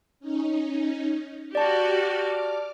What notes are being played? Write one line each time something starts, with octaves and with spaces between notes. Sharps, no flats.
C#4 D#4
F#4 G4 D5 A5 D6 F6